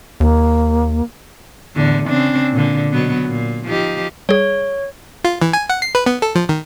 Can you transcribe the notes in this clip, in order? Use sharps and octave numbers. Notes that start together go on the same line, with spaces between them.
D#2 A#3
E2 A2 D3
C#3 C4 D4
A#2 D3
B2 F#3 B3
A#2
F3 D#4 G4
G3 G#4 C#5
F4
E3
G#5
F#5
C7
B4
B3
A4
F3
D#3